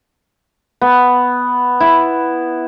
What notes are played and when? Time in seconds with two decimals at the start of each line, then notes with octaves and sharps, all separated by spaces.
0.81 B3
1.80 E4